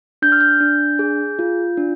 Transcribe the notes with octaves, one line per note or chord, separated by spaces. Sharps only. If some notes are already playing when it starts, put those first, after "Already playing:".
D4 G6
F6
G6
D4
G#4
F4
D4